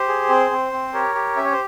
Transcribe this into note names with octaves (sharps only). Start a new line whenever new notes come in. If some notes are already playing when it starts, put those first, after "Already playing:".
Already playing: G4 C5
G#4
C4
C4
C4
G4 A#4 C#5
G4
C#4 E5
C#5
C5